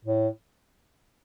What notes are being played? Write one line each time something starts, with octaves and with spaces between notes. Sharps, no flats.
A2